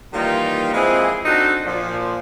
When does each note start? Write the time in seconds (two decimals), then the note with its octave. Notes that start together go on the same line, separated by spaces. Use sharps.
0.13 D#3 E3 G3 A#3 D#4 F4
0.73 E3 F3 G#3 C4 G#4
1.25 C4 D4 D#4 F#4 A4
1.65 A#2 F3